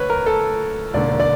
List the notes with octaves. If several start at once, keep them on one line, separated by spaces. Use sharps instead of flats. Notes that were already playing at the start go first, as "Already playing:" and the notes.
Already playing: D2 B4 C#5
A#4
A4
E1 D#2 D3 D5
D5